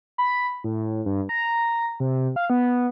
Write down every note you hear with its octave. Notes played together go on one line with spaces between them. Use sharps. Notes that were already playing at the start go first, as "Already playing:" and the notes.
B5
A2
G2
A#5
C3
F5
B3